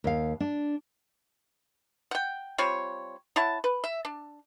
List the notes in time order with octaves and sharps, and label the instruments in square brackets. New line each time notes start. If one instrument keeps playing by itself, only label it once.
[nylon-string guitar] D#2 F5
D4
[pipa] F#5 G5
G3 C4 F4 C#5
E4 C#5 F#5 A5
B4
E5
D4